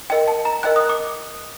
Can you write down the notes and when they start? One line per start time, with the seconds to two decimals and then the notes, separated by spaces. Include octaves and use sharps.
0.10 A#4 D#5 G5
0.28 A5
0.45 A#5
0.63 A#4 D#5 G5 F#6
0.76 D#6
0.89 D6